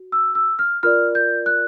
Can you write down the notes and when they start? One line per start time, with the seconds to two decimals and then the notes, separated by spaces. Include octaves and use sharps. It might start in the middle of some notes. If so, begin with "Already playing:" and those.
Already playing: F#4
0.12 E6
0.35 E6
0.59 F6
0.83 F4 A#4 D5 F6
1.15 G6
1.46 F#6